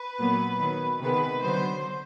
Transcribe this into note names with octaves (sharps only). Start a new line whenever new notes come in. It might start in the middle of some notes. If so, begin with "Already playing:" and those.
Already playing: B4
A#2 F#3 B3
D#3 F#3 B3
C3 D#3 G#3 B3 B4
D3 F#3 B3 C5